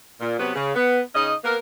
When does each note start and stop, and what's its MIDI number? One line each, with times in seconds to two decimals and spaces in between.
0.21 0.36 46
0.40 0.52 48
0.40 0.52 54
0.40 0.52 59
0.55 0.75 49
0.76 1.01 59
1.15 1.34 49
1.15 1.34 61
1.15 1.34 63
1.15 1.34 75
1.44 1.57 58
1.44 1.57 59
1.44 1.57 70